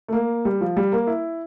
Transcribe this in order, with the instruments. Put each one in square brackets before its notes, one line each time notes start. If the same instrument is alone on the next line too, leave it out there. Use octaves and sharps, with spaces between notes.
[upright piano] A3
A#3
G3
F3
G3
A#3
E4